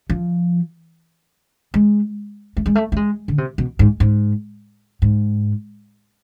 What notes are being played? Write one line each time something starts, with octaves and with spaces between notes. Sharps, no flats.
F3
G#3
A3
G#3
A3
A3
G#3
D3
C3
B2
G#2
G#2
G#2